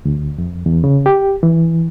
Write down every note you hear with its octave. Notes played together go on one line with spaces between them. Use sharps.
D2
F2
E2
C#3
G4
E3